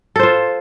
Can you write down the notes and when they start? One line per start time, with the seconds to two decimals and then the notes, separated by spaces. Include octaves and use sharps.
0.16 A4
0.19 C5
0.23 F4